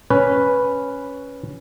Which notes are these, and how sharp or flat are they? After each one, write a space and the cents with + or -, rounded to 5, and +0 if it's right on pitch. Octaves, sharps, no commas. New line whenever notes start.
C#4 +0 B4 +0